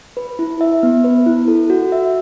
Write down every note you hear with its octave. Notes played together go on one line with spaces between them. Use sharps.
B4
E4
E5
B3
B4
E4
A4
F#4
E5